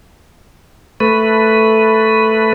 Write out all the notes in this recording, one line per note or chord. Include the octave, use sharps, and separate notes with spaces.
A3 B4